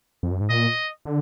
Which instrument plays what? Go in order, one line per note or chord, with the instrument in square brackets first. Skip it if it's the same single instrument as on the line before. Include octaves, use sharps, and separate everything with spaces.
[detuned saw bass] F2
F#2
G#2
[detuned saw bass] A#2 [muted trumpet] D#5
[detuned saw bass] D3